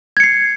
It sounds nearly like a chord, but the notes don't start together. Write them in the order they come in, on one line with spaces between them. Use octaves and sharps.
G#6 C#7 C7